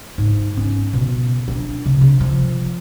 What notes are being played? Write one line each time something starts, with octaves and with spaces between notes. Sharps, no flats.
G#2
C#4
B2
D4
C3
C3
F3